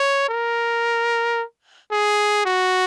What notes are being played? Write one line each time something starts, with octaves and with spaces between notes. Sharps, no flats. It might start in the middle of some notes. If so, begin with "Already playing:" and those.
Already playing: C#5
A#4
G#4
F#4